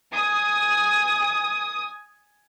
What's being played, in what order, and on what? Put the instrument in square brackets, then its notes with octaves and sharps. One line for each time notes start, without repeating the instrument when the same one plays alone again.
[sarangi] G#5 [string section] D#6